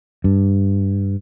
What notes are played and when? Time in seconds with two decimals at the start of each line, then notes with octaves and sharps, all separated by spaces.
0.24 G2